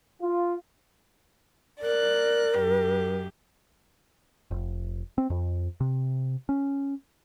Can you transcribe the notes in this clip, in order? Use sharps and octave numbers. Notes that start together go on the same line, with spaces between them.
F4
A#4 D5 F#6
F#2 G4
F1
C4
F2
C3
C#4